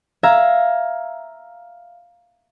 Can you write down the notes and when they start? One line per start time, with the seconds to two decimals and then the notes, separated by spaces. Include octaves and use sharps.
0.23 E5 F5 A#5 G#6